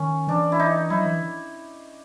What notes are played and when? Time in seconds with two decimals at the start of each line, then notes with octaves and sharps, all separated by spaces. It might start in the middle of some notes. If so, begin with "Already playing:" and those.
Already playing: D#3 C#4
0.27 E3 D4
0.52 E4
0.60 D#4
0.90 F#3 E4
1.05 E3